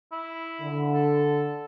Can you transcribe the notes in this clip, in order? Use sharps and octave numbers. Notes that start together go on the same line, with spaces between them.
E4
D3
A4